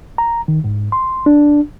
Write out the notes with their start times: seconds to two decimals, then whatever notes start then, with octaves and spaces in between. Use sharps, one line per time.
0.18 A#5
0.48 D#3
0.64 G#2
0.92 C6
1.26 D4